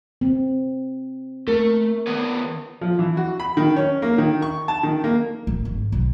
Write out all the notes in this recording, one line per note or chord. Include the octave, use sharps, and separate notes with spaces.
C4
A3 A#4
D#3 B3 B4
F3
E3
F#4
B5
D#3
C#4
A#3
D#3
C#6
A5
D#3
A#3
A1
G#1
B1